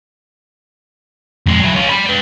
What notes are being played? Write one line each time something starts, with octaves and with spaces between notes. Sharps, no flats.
F2 G#3
F#3 E4
C#4 F4
D5 B5
B4 G5